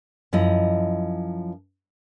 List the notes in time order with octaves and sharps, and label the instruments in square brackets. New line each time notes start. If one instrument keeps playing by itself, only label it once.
[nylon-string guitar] F#2 F3 E4 D#5